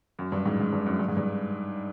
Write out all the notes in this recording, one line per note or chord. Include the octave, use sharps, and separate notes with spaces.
F#2
G2
G#2
G#2
G2
F#2
G2
G#2
G2